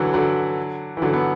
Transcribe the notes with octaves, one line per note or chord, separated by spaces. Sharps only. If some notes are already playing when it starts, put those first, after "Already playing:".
Already playing: D3 E3 F#3
D3 F#3
E3
D3 F#3
B3